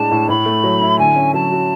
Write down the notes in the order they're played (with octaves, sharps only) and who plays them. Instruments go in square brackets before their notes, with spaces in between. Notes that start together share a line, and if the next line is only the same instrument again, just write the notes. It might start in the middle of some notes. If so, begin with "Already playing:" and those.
Already playing: [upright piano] A2 G#3 D4 [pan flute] A5
[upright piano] A2
[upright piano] A2 [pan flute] B5
[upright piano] A3
F#3
E4
[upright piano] D3 [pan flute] G#5
[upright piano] C#4
[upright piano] F#3 [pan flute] A5
[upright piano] F#4